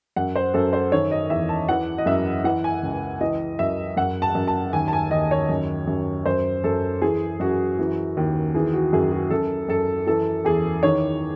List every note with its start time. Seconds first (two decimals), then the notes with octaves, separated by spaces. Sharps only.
0.16 F#2 F#5
0.36 C5
0.54 F#2 A4
0.73 C5
0.92 D#3 C#5
1.11 D#5
1.30 E2 E5
1.49 A5
1.69 E3 F#5
1.98 D#5
2.06 F#2 E5
2.44 E3 F#5
2.64 G#5
2.83 C#2
3.21 E3 D#5
3.59 F#2 E5
3.97 F#2 F#5
4.22 A5
4.35 F#2
4.48 A5
4.73 D#2 G#5
4.88 A5
4.93 G#5
5.11 D#2 D#5
5.31 C#5
5.49 F#2
5.87 F#2
6.26 F#2 C5
6.64 F#2 A4
7.02 E3 G#4
7.40 F#2 F#4
7.79 E3
8.17 D#2
8.54 E3 G#4
8.74 F#4
8.93 F#2 G#4
9.11 F#4
9.30 F#2 A4
9.68 F#2 A4
10.07 E3 A4
10.45 E2 G#4
10.83 D#3 C#5